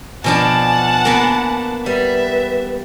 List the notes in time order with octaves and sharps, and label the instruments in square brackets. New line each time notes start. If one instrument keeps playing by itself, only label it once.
[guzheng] B2 F3 D4 [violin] F#5 A5 [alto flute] G#5
[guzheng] A#3 B3
[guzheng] G3 [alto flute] B4 [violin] E5